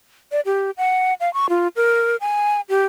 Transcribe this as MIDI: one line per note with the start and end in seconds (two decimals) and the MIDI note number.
0.32 0.40 74
0.46 0.71 67
0.78 1.14 78
1.20 1.32 77
1.34 1.49 85
1.49 1.68 65
1.76 2.16 70
2.21 2.61 80
2.69 2.86 67